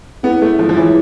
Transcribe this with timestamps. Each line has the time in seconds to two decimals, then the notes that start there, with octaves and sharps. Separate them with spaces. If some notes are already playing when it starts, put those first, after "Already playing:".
0.23 B3 E4 G#4 C#5
0.42 A3
0.59 F3
0.69 F3
0.77 E3 E4 G#4 C#5